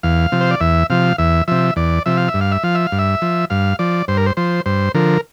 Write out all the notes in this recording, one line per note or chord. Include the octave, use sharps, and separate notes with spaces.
E2 F5
C3 F3
C5
D5
E2 E5
C3 F3 F5
E2 E5
C3 F3 E5
E2 D5
C3 F3 E5
F5
E5
G2
F5
E5
F3 F5
E5
F5
G2
E5
F3
G2 F5
F3 D5
G2 C5
A#4
C5
F3 C5
G2 C5
D3 F3 A#4